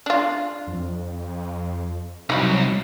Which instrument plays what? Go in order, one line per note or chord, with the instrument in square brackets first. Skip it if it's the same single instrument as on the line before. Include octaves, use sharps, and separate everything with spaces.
[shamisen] D4 F4
[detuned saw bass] F2
[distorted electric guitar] C2 [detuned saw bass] F#3 [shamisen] D#4 B5